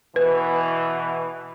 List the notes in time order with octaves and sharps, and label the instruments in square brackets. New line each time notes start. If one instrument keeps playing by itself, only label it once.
[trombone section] B2 E3 [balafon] B4